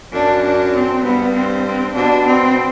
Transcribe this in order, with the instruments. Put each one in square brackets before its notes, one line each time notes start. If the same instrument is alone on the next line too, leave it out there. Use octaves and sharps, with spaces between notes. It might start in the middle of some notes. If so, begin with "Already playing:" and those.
[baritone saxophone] F#2 [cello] D4
[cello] D4
C4
[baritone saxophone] G2 [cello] B3
[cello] C4
C4
[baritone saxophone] B2 [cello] D4
[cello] C4